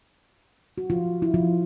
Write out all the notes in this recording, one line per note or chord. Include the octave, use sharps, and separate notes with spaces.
F#4
F3 F4
E4
F3 F4